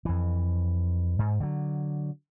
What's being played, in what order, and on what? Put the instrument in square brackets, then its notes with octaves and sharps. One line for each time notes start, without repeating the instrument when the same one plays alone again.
[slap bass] F2 E3
G#2
D3 F#3